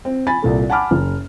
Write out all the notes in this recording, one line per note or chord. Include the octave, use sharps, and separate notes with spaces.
C4
G#5 B5 A6
C2 A#2 A4
F#5 G#5 A5 B5 D6 F6
F#1